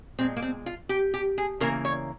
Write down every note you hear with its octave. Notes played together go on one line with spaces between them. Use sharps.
A#2 G#3 C4
A#3
C4
F4
G4
G4
G#4
C#3 E3 A#3 A#4
C#5